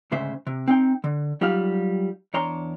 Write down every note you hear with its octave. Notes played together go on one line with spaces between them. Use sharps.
D2 G#2 C#3 C5 E5
C3
C4 D#4 G5
D3
F#3 G3 D#4 F4 G4 F5
E2 D4 C#5 A#5 C6